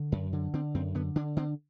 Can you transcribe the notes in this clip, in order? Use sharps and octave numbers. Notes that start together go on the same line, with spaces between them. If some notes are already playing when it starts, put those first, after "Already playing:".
Already playing: D3
F#2
D3
D3 C4
F#2 C4
D3 B3
D3 D4
D3 C4